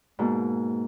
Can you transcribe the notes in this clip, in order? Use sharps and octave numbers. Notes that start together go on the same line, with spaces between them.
G#2 B2 A#3